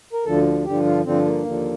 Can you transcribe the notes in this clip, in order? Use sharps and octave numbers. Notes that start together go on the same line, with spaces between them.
A#4
D2 D3 F3 A4
G2 D3 F3 G4
F4
G2 D3 F3 C4
A#3
D#2 D3 F3